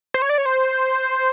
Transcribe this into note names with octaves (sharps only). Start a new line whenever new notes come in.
C5
C#5
D5
C#5
C5